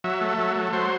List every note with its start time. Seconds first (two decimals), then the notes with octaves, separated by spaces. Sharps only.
0.04 F#3 E5
0.21 A3
0.39 F#3
0.56 A3
0.73 F#3 C5